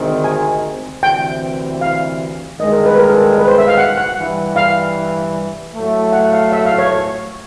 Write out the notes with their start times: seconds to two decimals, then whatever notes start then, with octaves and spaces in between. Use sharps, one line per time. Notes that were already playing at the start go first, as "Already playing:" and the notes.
Already playing: D2 C3 D#3 G#3 C4
0.24 G#5
1.03 D2 C3 E3 G5
1.81 F5
2.60 G2 D#3 G#3 D#5
2.72 A#4
2.86 B4
2.98 A#4
3.10 A4
3.21 A#4
3.38 B4
3.48 C5
3.58 E5
3.68 F5
3.78 F#5
3.97 F#5
4.17 G2 E3 G3
4.56 F5
5.74 A2 F#3 A3
6.12 F#5
6.32 F5
6.52 E5
6.65 F5
6.78 C#5
6.91 C#5